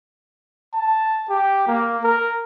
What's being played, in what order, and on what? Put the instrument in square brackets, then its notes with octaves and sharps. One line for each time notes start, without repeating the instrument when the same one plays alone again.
[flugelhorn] A5
G4
A#3
A#4